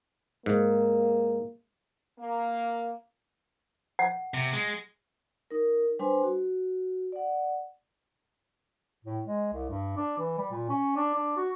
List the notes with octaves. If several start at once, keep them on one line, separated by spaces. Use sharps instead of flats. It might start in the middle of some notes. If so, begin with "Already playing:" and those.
G#2 A#3
A#3
F#5
C3
G#3
D#4 A#4
G3 D4 B4 C5 G#5 C6
F#4
D5 F#5
A2
G#3
C2
G2
D4
E3
G3
A#2
C#4
D4
D4
F#4